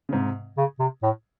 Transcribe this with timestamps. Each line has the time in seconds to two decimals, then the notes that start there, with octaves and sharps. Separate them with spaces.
0.09 C#3
0.12 G#2 C3
0.58 C#3
0.79 C3
1.03 A2